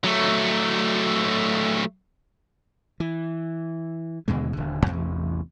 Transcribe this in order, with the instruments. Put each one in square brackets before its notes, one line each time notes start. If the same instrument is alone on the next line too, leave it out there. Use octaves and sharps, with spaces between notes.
[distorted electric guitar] F#3 A3
[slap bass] E3
D#2 B2 D3 G#3
D#1 D3
A1 E2 C3